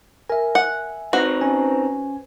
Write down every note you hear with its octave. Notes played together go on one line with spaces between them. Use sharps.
A#4 E5 G#5
F#5
C4 D#4 F#4 B4 C5
C#4 G#5